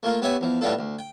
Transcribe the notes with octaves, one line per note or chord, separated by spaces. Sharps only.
A3 A#3 F4 A#4
B3 F#4 G4 C#5 E5 G#5
E2 F3
A2 G3 B3 D4 F4 A4
D2
G5